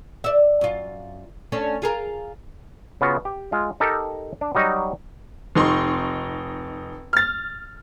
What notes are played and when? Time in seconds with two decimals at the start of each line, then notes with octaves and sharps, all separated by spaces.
0.24 D5 E5
0.61 F#2 F4
1.52 A3 C#4 D4
1.82 F4 G#4 A#4
3.01 C#3 B3 F4 F#4
3.25 G4
3.52 G#3 F4
3.80 D#4 G4 A4 A#4
4.41 D4
4.55 F#3 G3 D#4 F#4 D#5
5.55 F1 D#4 C6 C#6
7.13 F6 A6